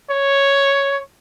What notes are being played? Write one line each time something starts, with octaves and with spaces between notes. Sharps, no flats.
C#5